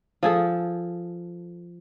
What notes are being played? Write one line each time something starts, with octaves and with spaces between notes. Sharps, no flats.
F3 G#4 A4